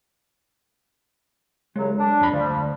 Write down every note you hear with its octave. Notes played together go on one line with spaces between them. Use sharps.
C2 C#3 F#3 G#3
D4
F2 B5
D2 F3 G3